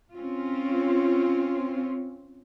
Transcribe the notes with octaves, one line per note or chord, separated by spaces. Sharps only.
C4 C#4 F4